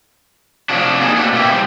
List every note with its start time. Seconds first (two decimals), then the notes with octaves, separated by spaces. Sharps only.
0.69 C3 F3 F#3 D4
1.01 A#3 D4 D#4 G#4
1.17 A3 A#3 C4 D4 F#4 G#4
1.32 B2 A#3 E4 G4
1.50 G#2 C3 G3 G#3